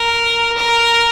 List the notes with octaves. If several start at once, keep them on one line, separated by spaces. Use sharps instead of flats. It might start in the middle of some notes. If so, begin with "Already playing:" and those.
Already playing: A#4
A#4